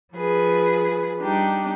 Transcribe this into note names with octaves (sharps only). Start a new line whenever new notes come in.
F3 G#4 B4
G3 D4 D#4 G4